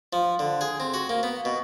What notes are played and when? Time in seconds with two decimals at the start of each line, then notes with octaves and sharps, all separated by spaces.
0.13 F3
0.39 D3
0.61 G#4
0.80 C4
0.94 F#4
1.09 A#3
1.23 B3
1.45 B2